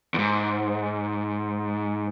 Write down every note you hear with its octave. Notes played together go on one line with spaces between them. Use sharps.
E2 G#2